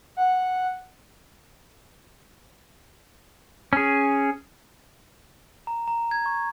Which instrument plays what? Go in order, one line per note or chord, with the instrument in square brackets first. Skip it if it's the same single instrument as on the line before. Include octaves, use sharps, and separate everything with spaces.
[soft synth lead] F#5
[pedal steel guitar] C#4 G#4
[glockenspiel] A#5
A#5
G#6
C#6